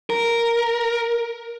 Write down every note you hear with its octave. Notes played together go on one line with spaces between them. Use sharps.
A#4